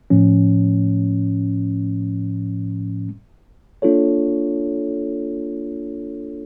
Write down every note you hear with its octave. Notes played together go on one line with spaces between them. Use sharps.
A2 F3 A3 C#4
A#3 D4 F4 A4 C#5